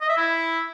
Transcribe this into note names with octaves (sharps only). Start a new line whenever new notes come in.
D#5
E5
E4